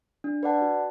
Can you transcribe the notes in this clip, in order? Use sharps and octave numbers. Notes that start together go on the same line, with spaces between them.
D4
B4 D5 F#5 A5
F#4